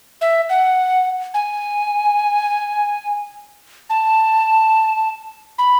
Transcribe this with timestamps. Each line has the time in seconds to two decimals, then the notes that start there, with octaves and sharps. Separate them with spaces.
0.21 E5
0.50 F#5
1.34 G#5
3.90 A5
5.58 B5